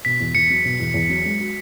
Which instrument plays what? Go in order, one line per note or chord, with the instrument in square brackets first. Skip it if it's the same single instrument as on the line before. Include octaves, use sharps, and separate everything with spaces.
[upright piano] B2 [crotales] B6
[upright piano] E2
[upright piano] E2 [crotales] C#7
[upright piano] F#3
B2
E2
E2
F#3
G#3
F#4